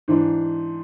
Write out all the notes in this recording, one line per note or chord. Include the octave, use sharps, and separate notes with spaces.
G#2 E3 D4